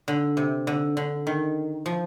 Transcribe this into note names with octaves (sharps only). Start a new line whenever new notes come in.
D3
C3
D3
D3
D#3
F3